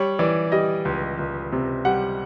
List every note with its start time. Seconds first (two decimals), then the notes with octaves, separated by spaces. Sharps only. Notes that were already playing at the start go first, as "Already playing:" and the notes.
Already playing: G3 C#5
0.19 E3 D5
0.52 G3 D#5
0.85 C#2
1.19 C#2
1.52 C3
1.85 G3 F#5